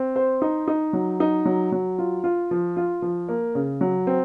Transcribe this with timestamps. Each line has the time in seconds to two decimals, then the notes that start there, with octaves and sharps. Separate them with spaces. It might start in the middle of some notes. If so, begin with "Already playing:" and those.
Already playing: C4
0.16 C5
0.42 D#4
0.68 D#4
0.93 F#3
1.20 D#4
1.45 F#3
1.72 F#3
1.98 F4
2.24 F4
2.51 F3
2.77 F4
3.02 F3
3.28 A#3
3.55 C#3
3.81 F#3
4.07 C4